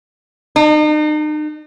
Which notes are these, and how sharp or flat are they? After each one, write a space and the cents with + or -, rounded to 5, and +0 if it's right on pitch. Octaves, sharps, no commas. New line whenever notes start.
D#4 -40